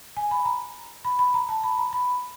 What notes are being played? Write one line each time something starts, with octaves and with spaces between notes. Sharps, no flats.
G#5
B5
A#5
B5
B5
A#5
A5
B5
A#5
B5